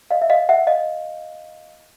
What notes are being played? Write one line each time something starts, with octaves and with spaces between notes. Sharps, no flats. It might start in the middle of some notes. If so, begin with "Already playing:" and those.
D#5 F5
E5
D#5 F5
E5 F#5
D#5 F5